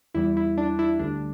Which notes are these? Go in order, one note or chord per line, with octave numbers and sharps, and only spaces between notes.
E2 E3 G3 E4
E4
D4
E4
D2 D3 G3 D4